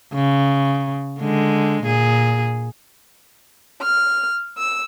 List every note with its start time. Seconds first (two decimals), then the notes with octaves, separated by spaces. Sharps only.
0.14 C#3
1.20 D3 G#3
1.83 A#2 G#4
3.82 F6
4.56 E6